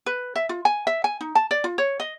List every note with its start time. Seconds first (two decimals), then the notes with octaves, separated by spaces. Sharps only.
0.06 B4
0.36 E5
0.49 F4
0.65 G#5
0.87 E5
1.04 G#5
1.21 D#4
1.35 A5
1.51 D5
1.64 F4
1.78 C#5
2.00 D#5